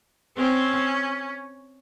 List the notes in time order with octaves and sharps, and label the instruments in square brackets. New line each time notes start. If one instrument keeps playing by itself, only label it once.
[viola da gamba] C4 [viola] C#4